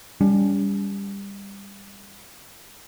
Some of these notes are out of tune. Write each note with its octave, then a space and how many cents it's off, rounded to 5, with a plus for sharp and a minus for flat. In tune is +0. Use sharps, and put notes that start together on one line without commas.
G3 +25 C#4 +40